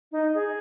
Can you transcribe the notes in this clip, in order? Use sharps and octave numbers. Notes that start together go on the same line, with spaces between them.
D#4
G#4